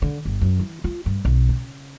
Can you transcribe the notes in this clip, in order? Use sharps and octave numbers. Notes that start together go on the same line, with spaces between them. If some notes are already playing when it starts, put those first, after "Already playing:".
D3
G1
F#2
E3
F4
G2
B1
C#3